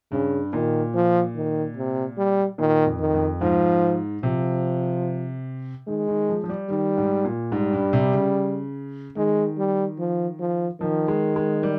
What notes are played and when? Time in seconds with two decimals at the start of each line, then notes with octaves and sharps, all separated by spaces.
0.12 G2 C#3
0.53 A#2 D#3
0.94 F3
1.35 D#3
1.77 C3
2.18 G3
2.58 A#2 D#3
2.86 F2
2.99 D#3
3.14 F2
3.41 G#2 F3
4.23 C3 F3
5.87 D#3 G#3
6.08 D#3
6.29 F3
6.44 F3
6.49 G3
6.69 D#3 G3
6.98 G#2
7.24 A#2
7.52 G#2 G3
7.73 G2
7.93 C3
8.13 C#3
9.16 D#3 G#3
9.58 G3
9.99 F3
10.40 F3
10.80 D#3 F3
11.08 G#3
11.36 G#3
11.63 G3